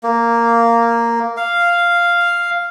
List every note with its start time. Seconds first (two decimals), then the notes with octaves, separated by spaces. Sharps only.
0.03 A#3
1.37 F5